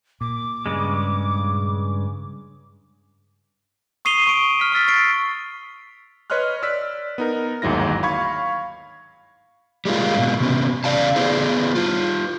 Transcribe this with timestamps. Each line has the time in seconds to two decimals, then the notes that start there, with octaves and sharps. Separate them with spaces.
0.21 A#2 D6
0.66 G2 C#3 G#3
4.05 C#6 D#6 C7 D#7 F7 G7
4.27 C#6 D7 D#7
4.60 F6 B6
4.72 C#6 E6 A6 B6
4.88 A6 C7 D7
6.30 B4 C#5 D#5 C6 F6 F#6
6.63 D5 E6 F#6 B6
7.18 B3 D#4 A#4
7.62 G1 D#2 G#2 F#3 E4 A#6
8.03 F5 B5 C#6 G#6
9.85 G3 G#3 A#3 F4
10.17 G#2 B2
10.40 C3 B3 C#4
10.84 E2 C#3 D5 F5 A5
11.16 B3 E4 G#4 C5
11.75 G3 F4